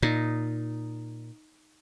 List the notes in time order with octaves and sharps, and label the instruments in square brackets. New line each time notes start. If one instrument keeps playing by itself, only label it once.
[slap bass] A#2 [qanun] D#4